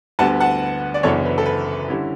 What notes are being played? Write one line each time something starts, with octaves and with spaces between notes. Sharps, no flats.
D2 D3 G3 B3 F#5 A5
F#5 A5
D5
F#1 F#2 E3 B3 D4 A4 C#5
B4
A4
B4
D3 G3 C#4 E4